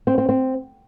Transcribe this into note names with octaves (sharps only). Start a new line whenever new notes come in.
C4
C4
C4